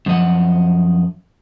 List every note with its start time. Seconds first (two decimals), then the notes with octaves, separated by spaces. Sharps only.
0.06 F#2 F3 D#5 F#5